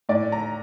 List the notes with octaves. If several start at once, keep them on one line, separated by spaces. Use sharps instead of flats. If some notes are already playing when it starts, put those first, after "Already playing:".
A2 D5
A#5